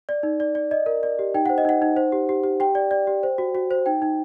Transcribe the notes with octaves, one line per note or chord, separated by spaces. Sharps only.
D5
D#4
D5
D5
D5 D#5
A#4
D5
G4
D#4 G5
C5 F#5
D#5
D#4 F#5
D#4
C5
G4
G4
G4
G4 G5
D5
D5
G4
C5
F#4
F#4
C5
D#4 G5
D#4